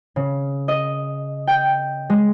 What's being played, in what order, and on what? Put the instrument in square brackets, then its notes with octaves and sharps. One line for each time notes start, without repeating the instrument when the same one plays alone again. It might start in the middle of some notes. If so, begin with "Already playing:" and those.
[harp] C#3
D#5
G5
G#3